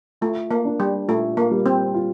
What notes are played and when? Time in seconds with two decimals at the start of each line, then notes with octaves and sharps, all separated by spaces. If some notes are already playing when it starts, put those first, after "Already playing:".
0.21 A3 F4
0.51 A#3
0.65 D4
0.80 G3
1.08 A#2 A3
1.37 A#3
1.51 G3
1.66 C4
1.94 F4